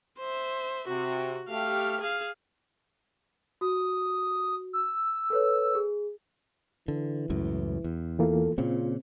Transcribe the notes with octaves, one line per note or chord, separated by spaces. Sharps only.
C5 E5
C3 F#4
A3 G4 F5 F6
G#4 F5
F#4 D#6
E6
A4 B4 C#5
G#4
D3 E3
C#2 F#2 A2
E2
E3 A#3 F4 A4
A#2 C#3 C4 F4